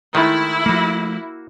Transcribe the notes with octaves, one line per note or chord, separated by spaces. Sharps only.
D#3 G#3 A3 E4
F3 A3 A#3 F#4